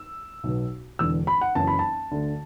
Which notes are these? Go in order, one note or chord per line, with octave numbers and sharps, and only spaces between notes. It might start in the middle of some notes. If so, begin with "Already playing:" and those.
Already playing: E6
B1 B2
E1 E2 D3 E6
B5
F#5
F#1 F#2 E3 A5
B5
A5
D2 D3